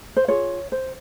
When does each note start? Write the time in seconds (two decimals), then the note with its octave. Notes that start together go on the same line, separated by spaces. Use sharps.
0.17 C5
0.28 F4 G#4 C#5
0.72 C5